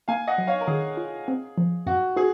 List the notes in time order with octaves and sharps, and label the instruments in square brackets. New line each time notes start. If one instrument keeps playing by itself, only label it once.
[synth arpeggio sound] A#3 [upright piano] F5 G#5
[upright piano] D#5 F#5
[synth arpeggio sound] F#3
[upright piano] C#5 F5
A#4
[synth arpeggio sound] D#3 [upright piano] G#4
[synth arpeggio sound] F4
C4
F3
[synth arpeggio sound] F#2 [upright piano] F#4
[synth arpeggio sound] F#4 [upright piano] G#4